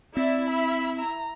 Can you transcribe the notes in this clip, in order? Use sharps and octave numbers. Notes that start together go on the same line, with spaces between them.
C4 E4 D5 E5
B5
A#5